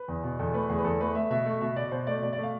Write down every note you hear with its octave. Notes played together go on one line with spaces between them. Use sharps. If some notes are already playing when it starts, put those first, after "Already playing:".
Already playing: B4
E2
B2
E2 A4
A3 B4
E2 G#4
B4
E2 A4
A3 B4
A3 E5
B2 E5
A3
B2 E5
B2 D5
B2 C5
A3 D5
B2 D5
D5
A3 F5